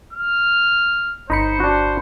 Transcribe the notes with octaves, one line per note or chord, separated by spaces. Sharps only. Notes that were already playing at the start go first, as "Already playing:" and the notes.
F6
G1 D#4 C5 B5 C#7
D4 F#4